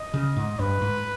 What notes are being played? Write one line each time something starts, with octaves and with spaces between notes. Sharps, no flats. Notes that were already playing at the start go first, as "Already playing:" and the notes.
Already playing: D#5
C#3
G#2
G2 B4
G#2